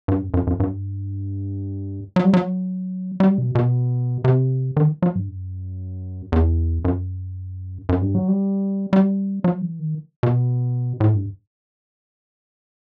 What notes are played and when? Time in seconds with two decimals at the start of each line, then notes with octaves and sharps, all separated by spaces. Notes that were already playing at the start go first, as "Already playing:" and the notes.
0.08 G2
0.21 F#2
0.34 F#2
0.47 F#2
0.60 G2
2.16 F#3
2.25 G3
2.33 F#3
3.20 G3
3.38 B2
3.55 B2
4.24 C3
4.77 D#3
5.02 F#3
5.15 G2
5.29 F#2
6.32 E2
6.85 F#2
7.89 F#2
8.02 G2
8.15 F#3
8.28 G3
8.93 G3
9.44 F#3
9.62 E3
9.79 D#3
10.23 B2
11.00 A2
11.14 G2